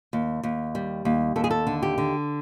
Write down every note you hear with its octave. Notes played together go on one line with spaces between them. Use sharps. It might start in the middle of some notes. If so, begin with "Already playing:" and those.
D#2
D#2
G3
D#2
D#2 A4
G#4
A4
D3
G4
D3